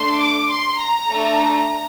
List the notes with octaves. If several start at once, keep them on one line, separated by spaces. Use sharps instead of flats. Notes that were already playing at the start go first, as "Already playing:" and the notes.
Already playing: A3 D4 A4 C6
D6
C6
A#5
A3 D4 A4